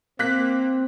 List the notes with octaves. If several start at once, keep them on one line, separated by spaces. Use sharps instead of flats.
A#3 C4 F#6 B6